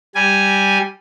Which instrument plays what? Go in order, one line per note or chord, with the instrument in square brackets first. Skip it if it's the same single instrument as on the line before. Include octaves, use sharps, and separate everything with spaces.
[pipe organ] G3 G#5